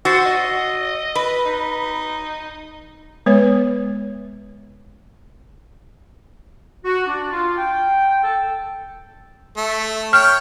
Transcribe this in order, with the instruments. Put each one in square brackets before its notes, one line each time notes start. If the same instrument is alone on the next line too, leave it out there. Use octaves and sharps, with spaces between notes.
[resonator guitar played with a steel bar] F#4 [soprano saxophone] C5 [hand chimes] E6 A6 C7
[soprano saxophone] D#5
[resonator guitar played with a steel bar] B4
[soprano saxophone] D#4
[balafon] G#3 B3 B4 C#5
[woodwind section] F#4
D4
F4
G5
A4
[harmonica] A3
[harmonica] C#5 G5 [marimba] F6